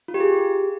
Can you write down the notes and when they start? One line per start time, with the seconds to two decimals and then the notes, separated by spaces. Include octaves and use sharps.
0.08 F4
0.14 G4
0.20 G#4